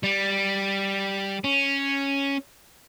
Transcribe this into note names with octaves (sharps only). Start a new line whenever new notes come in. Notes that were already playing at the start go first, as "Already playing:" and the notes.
G3
C#4